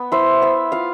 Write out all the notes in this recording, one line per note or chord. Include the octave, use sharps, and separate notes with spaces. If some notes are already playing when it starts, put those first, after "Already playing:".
Already playing: B3
E4 C5
B3 E5
F4 F5